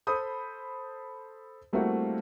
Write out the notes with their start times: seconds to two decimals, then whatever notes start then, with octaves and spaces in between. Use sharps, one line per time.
0.07 A4 C5 B5 D#6 G6
1.73 G3 A3 A#3 C4 E4 F#4